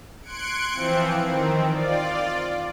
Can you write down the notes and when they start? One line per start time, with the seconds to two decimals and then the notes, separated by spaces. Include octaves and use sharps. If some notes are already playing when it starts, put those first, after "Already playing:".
0.22 C6 F#6 G#6 C#7 D7
0.72 E3 F3 C4
1.22 D#3 C4
1.72 F4 D5